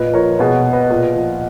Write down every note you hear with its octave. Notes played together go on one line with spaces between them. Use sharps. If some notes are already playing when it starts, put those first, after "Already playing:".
Already playing: A#2 B4 D#5
F3 A#4 C#5
B2 G#4 B4
B4 D#5
A#2
F3